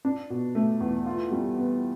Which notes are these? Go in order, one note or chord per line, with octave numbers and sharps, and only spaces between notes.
D4
B2
A3
E2
F4
G3
B3